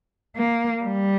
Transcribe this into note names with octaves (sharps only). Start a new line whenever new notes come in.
A#3
G3